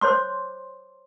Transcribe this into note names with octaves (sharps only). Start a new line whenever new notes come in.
C5 C#5 C6 D6